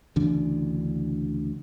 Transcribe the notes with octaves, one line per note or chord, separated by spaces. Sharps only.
D2 C#3 E3 D4